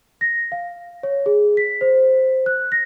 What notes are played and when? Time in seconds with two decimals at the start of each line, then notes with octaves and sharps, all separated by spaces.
0.21 A#6
0.52 F5
1.03 C#5
1.26 G#4
1.57 B6
1.81 C5
2.46 F#6
2.72 A#6